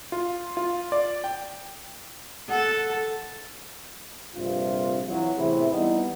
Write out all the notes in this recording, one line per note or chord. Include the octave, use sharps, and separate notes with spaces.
F4
F4
D5
G5
A4 F#5
A#1 G2 C3 F4
E3 F#3
E2 A2 C3 E4 G#4 B4
E3 G3 B3 D#4 E4